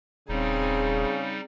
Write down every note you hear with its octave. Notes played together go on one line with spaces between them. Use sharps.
D#1 C#3 G3 C4 D#4 G#4